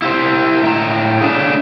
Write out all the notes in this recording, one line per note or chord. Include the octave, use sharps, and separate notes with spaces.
E4 G4 C5
A2 G5 A#5
A3 C#4 D4 G#4